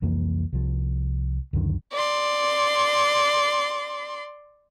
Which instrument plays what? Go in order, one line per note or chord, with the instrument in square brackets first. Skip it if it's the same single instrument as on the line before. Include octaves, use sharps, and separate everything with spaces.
[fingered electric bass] C2 F2 E3 A#3
C2 F3
C#2 F#2 D3 D#3
[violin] D5 C6